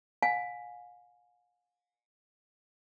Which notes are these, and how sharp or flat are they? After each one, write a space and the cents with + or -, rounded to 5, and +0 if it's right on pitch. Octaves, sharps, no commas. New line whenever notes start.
F5 +40 G#5 +0